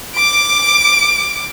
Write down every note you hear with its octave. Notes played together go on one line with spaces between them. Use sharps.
D6 D7